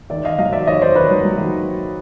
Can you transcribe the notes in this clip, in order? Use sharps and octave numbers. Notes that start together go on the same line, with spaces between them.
D#3 D5 E5
D#3 D#5 F5
F#3 D#5 F5
D#3 D5 E5
D#3 C#5 D#5
D#3 C5 D5
D#3 B4 C#5
F#3
F#3
D#3